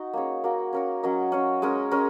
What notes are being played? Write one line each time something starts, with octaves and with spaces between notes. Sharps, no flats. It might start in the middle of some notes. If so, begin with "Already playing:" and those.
Already playing: D#4 F#4
A#3 C#4 G#4 C#5
A#3 F#4 A#4
C#4 A#4 C#5
F#3 C#4 A#4 D#5
C#4 F#4 C#5
G#3 C#4 A#4
G#3 C#4 A#4